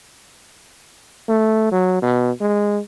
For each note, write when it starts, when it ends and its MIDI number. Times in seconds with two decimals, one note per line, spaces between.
1.29 1.70 57
1.72 1.97 54
2.02 2.31 47
2.41 2.79 56